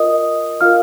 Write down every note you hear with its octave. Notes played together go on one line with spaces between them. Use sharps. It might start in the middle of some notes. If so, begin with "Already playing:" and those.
Already playing: F4 A#4 D#5 D#6
F4 A#4 F5 F6